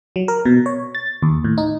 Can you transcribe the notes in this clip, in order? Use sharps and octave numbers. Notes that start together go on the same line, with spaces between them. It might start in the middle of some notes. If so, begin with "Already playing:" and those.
F#3
A#4
B2
C#5
A6
D#2
A2
D#4